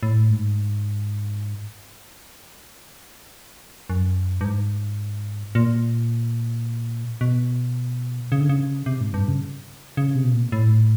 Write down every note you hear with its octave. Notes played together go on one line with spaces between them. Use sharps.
A2
G#2
F#2
G2
G#2
A#2
B2
C#3
D3
C#3
C3
G#2
G2
C#3
C#3
C3
B2
A#2
A2